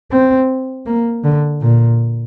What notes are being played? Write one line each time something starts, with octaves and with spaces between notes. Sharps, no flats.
C4
A#3
D3
A#2